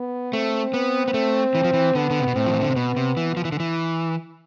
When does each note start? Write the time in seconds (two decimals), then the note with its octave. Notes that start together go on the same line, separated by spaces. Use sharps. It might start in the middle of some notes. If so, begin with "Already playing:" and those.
Already playing: B3
0.33 A3 C4
0.74 B3
1.08 B3
1.14 A3
1.55 E3
1.64 F3
1.73 E3
1.95 D3 B3
2.11 D3
2.19 C3
2.28 B2
2.36 A2 C4
2.47 F3
2.54 E3
2.61 D3
2.69 C3
2.76 B2 B3
2.97 C3
3.17 E3
3.37 F3
3.45 E3
3.52 D3
3.60 E3